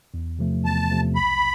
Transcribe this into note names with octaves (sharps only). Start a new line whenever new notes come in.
E2
C3 F3 A3
E2 A5
C3 F3 A3
B1 B5